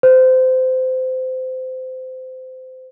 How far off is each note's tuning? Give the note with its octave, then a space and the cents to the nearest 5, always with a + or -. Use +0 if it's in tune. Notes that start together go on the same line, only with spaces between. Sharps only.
C5 -25